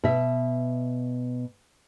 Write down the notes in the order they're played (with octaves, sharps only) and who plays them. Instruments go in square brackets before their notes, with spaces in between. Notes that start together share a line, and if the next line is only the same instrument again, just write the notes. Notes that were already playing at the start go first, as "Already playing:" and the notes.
[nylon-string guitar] B2 E5